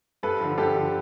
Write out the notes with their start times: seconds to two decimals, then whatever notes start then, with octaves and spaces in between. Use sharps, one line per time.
0.23 G2 A4 B4
0.40 D3 F3
0.58 G2 G4 A4
0.75 D3 F3